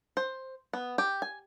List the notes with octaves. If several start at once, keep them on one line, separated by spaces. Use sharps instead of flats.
C5
B3
G4
G#5